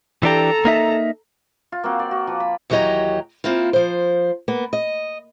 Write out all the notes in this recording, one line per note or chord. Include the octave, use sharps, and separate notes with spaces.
E3 D4 G4 A4 A#5
A#3 D#4 E5
F4
A#3 C4 F#4
D5
F#4
F3
B5
D#2 E3 F#3 G4 D#5 A#5
A#3 C4 E4 F4
F3 C5
A#3 B3
D#5